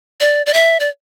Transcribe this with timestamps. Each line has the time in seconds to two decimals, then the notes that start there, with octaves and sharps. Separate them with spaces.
0.20 D5
0.46 D5
0.54 E5
0.80 D5